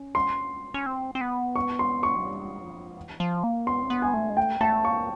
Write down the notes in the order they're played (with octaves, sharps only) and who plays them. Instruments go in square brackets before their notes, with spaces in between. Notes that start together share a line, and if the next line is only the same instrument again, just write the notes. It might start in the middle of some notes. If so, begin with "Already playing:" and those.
Already playing: [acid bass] C#4
[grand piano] C6
[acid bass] C#4
C4
C4
B3
[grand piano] C#6
C6
C#6
[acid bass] F#3
G3
F3
E3
F3
A#3
[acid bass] B3 [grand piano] C6
[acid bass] C4
B3
[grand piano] G#5
[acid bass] A3
G#3
[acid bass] A3 [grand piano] G5
[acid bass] A3 [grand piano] A5
[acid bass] A#3 [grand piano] C#6